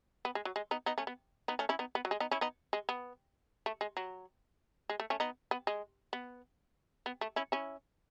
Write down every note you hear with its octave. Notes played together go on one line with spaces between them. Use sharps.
B3
G#3
F#3
G#3
B3 D#4
B3 D#4
A3 C#4
B3
B3 D#4
A3 C#4
C#4 E4
B3 D#4
B3
F#3
G#3
B3 D#4
C#4 E4
B3 D#4
G#3
B3
A3
G#3
F#3
G#3
A3
A3 C#4
B3 D#4
B3
G#3
B3
B3
A3
C#4 E4
C#4 E4